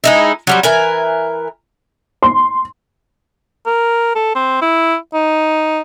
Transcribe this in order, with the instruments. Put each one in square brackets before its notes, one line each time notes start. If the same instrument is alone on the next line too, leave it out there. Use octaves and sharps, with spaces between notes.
[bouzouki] G#3 D#4 E4
F#3 G3 C4
E3 A#4 G#5
[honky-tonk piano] C6
[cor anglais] A#4
A4
C4
E4
D#4